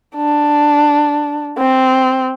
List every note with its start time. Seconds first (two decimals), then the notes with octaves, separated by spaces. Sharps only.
0.16 D4
1.58 C4